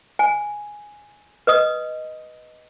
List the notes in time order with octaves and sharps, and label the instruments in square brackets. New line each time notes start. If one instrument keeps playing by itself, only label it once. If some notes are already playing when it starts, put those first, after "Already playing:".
[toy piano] G#5
B4 D#5 D#6